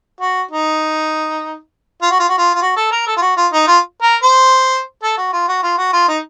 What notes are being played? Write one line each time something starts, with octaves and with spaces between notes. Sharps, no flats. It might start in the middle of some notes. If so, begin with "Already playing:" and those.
F#4
D#4
F4
F#4
F4
F#4
F4
F4
F#4
A4
A#4
A4
F4
F#4
F4
D#4
F4
A#4
C5
A4
F#4
F4
F#4
F4
F#4
F4
D#4